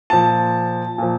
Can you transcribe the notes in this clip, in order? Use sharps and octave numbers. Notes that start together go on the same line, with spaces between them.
A#2 F3 A5
A#2 F3